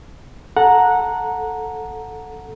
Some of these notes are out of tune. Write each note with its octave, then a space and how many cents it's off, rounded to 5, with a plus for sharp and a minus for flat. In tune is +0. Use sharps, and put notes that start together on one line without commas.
A4 +0 F#5 -15 A#5 +0